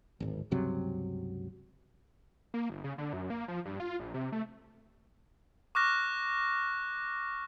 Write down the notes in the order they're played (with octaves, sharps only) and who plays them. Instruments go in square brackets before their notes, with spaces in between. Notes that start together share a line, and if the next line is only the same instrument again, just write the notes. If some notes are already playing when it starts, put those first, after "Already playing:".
[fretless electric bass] D1 G#1
C#2 G2 C3 F#3
[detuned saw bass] A#3
G1
C#3
D3
F#2
A#3
F3
G2
F4
A#1
C3
A3
[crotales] C#6 D6 F6 F#6 A#6